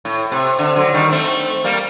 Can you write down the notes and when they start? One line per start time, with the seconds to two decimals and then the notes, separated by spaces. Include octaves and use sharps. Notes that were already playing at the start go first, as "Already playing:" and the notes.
0.05 A2
0.32 C3
0.59 D3
0.76 D3 F#3
0.94 D#3 G3
1.11 A3 C4
1.64 G3 A#3